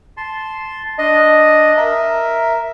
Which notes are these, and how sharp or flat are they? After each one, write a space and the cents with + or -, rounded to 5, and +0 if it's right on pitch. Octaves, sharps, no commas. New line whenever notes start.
A5 -10 C6 +0
D4 +0 D#5 +0
A#4 +0 E5 +0